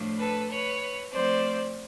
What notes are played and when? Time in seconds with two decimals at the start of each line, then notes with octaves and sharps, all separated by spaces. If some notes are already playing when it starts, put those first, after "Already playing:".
Already playing: A2 F3 A3 D4
0.19 A4 B4
0.50 B4 C#5
1.12 F3 A3 C4 C5 D5